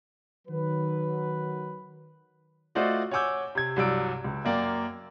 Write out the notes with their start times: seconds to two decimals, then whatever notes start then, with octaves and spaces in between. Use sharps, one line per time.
0.48 D#3 F#3 B4
2.75 A3 F4 F#4 C5 D5 D#5
3.11 C#5 F#5 G#5 D6 E6 G6
3.55 C3 G#6
3.76 C2 G2 F#3 D5 E6 D7
4.24 C#2
4.45 F#2 A#3 D5 G5